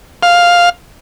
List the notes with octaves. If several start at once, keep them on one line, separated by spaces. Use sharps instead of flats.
F5